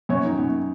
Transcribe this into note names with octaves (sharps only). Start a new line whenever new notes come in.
F#2 C#5
D#3
F#2